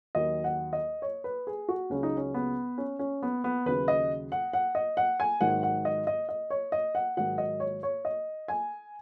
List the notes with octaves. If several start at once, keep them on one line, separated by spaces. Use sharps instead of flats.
D#2 D#3 F#3 D#5
F#5
D#5
C#5
B4
G#4
F#4
C#2 C#3 F#3 C#4
D#4
C#4
B3
C#4
C#4
B3
B3
D#2 C#3 F#3 B4
D#5
F#5
F#5
D#5
F#5
G#5
G#2 D#3 F#3 F#5
F#5
D#5
D#5
D#5
C#5
D#5
F#5
G#2 D#3 F#3 F#5
D#5
C#5
C#5
D#5
G#5